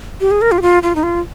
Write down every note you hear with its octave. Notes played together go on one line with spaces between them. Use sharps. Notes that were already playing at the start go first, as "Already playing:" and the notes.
G4
G#4
A#4
F4
G4
F4
F4
D#4
F4